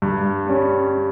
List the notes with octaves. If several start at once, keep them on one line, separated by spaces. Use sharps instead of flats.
G2
G3 C#4